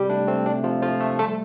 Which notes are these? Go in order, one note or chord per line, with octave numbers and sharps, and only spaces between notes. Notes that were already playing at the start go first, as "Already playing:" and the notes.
Already playing: C3 G3 G4
A3 D4
A3 C4
C3 D4
C3 F3 F4
F3 A3 F4
A3 A4
G3 A3 A4